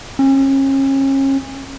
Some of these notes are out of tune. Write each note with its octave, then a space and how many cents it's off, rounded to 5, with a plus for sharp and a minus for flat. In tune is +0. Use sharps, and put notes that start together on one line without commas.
C#4 -35